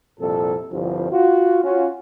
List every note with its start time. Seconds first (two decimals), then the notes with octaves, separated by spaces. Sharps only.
0.20 C2 F2 A#2 A4
0.71 G1 C2 F3
1.12 F4 F#4
1.64 C#4 F4 F#4